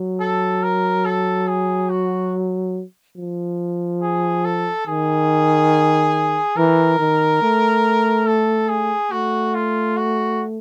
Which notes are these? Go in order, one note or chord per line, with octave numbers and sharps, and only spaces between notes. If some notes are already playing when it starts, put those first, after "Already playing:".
Already playing: F#3
A4
A#4
A4
G#4
F#4
F3
G#4
A4
D#3 G#4
E3 A#4
D#3
A3
A4
G#4
A3 F#4
F4
F#4